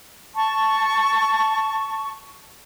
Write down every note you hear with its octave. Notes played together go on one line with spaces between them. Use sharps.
A5 C#6